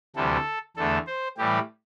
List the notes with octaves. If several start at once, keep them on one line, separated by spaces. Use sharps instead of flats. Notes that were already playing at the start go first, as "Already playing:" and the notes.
D2 C3 E3 G3 A4
E2 D3 A3 A4
C5
A2 E3 G3 G4